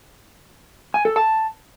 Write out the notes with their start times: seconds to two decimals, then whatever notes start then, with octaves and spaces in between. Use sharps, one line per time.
0.94 G#5
1.05 A4
1.16 A5